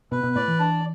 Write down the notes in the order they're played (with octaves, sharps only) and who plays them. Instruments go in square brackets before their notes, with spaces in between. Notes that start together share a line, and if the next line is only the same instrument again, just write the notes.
[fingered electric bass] B2 [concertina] B4
[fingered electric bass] B2
[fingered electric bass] A2 [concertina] D5
[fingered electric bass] E3
[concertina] D4